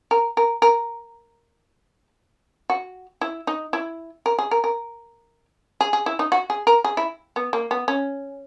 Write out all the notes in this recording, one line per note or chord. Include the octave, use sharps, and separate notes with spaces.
A#4
A#4
A#4
F#4
E4
D#4
E4
A#4
G#4
A#4
A#4
G#4
G#4
E4
D#4
F#4
G#4
A#4
G#4
E4
B3
A#3
B3
C#4